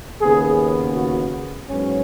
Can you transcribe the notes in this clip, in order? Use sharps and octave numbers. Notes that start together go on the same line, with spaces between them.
D#2 C#3 B3 G#4
F#4
G#2 F#3 B3 C#4